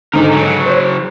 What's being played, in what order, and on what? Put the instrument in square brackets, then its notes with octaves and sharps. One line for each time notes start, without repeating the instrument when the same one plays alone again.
[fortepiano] G#2 D3 [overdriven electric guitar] D#4 A#4
[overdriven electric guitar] C#3 F#3
[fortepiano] C5 C#5